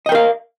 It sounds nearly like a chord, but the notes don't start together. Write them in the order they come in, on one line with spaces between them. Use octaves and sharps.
D#5 G5 A#4 F5